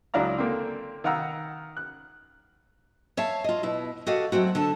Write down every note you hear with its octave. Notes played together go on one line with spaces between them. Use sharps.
C#2 F#3 D4 E4 F5 A#5
D3 A#3 C4
D#3 F5 F#5 A#5 E6
F#6
C#5 E5 F5 A5
F4 D#5
B2 E4
F#4 G4 A4 D#5 F5 F#5
F#3 A3 C4 F#4
D3 A4 A5